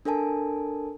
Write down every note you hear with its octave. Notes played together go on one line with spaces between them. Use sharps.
D4 A4 A#4 G#5 A5